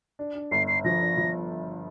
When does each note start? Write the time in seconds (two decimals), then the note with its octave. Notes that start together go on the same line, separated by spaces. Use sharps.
0.19 D4
0.35 D4
0.51 G1 C7
0.68 D4 C7
0.85 F3 A#6
1.01 D4
1.17 F3